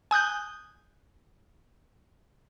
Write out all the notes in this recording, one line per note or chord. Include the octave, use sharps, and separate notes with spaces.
G#5 D#6 F#6 G6